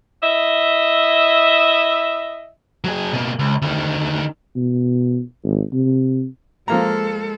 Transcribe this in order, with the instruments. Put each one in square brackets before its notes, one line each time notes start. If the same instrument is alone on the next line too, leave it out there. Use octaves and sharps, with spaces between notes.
[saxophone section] E4 D#5 E5
[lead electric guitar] F#3 G#4
B2 A#3
C#2
D2 D#3
[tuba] B2
G#1
C3
[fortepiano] F3 A#3 A#5 [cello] G#3 A4